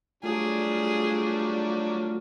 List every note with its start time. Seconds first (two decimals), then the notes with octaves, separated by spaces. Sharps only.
0.23 F#3 G3 A3 D4 F4 G#4